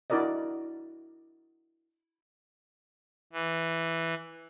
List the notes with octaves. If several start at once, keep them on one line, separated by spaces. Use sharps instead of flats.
D4 E4 F#4 A#4 D5 D#5
E3